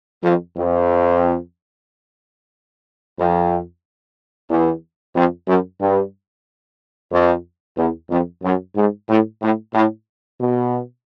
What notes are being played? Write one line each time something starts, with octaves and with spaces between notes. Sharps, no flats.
F2
F2
F2
E2
F2
F#2
G2
F2
E2
F2
F#2
G#2
A2
A2
A2
B2